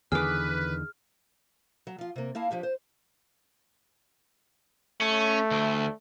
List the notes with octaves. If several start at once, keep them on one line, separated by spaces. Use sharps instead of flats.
E2 D3 D#3 G#4 B4 D6 F6
F#3
F3 F4
C3 A#3
A#3 E4 F5 A5
F3 D4 G4
C5
A3 C#4
D2